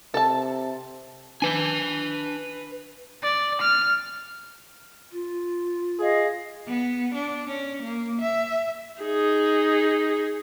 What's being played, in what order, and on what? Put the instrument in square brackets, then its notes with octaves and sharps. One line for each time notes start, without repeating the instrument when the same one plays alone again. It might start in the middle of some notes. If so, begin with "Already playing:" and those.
[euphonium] C3 [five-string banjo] A4 A5
[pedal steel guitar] D4 G6 [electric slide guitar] B4 G#5
[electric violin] D5
F6
[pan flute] F4
[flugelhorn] G#4 [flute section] D#5 F5
[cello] B3
D4
C#4
A#3
E5
[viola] D#4 G#4